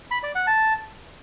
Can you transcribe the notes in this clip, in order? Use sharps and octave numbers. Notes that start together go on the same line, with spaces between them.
B5
D5
F#5
A5